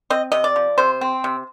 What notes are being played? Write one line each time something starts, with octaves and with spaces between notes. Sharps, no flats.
C4 D#5
C3 D#5
D5
F3
C3 C5
C4
C3